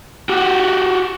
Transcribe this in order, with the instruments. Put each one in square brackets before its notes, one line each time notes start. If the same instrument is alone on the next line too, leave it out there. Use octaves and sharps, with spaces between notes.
[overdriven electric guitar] F#4 G4